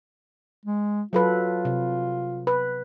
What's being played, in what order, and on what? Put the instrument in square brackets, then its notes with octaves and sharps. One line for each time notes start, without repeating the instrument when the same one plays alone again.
[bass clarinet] G#3
[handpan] F#3 A4 B4 [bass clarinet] F4
[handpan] C3
B4